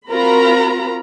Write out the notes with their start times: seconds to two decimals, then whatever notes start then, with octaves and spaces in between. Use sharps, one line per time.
0.11 C4 F4 F#4 A#4 A#5 B5